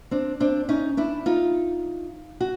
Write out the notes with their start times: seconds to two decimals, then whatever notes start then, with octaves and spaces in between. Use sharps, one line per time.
0.11 C4 D4
0.40 C4 D4
0.69 C#4 D#4
0.97 D4 E4
1.26 D#4 F4
2.41 F#4